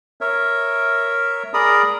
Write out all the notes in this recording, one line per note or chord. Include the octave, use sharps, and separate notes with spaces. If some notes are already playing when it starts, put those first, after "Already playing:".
A#4 C#5 E5
G#4 A#4 D5 A#5 B5 D#6